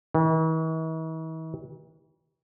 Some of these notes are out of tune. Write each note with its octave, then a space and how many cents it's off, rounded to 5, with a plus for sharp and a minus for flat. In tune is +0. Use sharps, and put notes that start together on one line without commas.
E3 -45